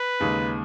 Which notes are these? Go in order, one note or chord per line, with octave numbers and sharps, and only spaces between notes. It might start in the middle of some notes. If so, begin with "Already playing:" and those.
Already playing: B4
D#2 C#3 G#3 D#4